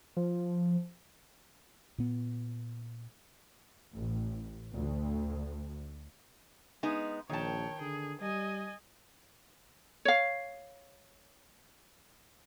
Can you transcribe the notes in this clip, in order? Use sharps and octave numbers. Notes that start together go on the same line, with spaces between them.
F3
A#2 B3
A1
D2
G#3 B3 D#4
A#1 D#3 C#5 G5 A5
D3 G#4
G3 D#5 G#5
C#5 F5